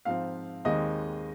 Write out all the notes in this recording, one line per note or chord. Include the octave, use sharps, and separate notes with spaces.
G#2 F3 C4 F5
D#2 D#3 G#3 C4 D#5